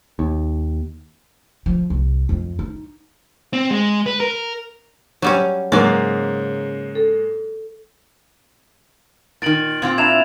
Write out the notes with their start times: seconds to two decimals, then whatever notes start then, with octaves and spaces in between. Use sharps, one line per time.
0.19 D#2
1.66 F3
1.90 C2
2.29 F2
2.59 D#4
3.53 C4
3.71 G#3
4.06 B4
4.20 A#4
5.22 F#3 G3 C#4
5.72 G#2 C#3 F#3 A#3 D5
6.95 A4
9.42 A#2 D#3 A6 D7 F#7
9.82 A#2 C4 F4
9.98 D4 E4 A#5 G#6 E7 F7